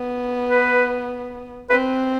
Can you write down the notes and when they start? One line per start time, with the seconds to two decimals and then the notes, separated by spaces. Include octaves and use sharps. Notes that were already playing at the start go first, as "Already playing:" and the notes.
Already playing: B3
0.49 B4
1.70 C4 B4